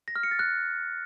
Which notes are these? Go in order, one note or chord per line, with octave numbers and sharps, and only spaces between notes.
A#6
F6
C#7
A6
F#6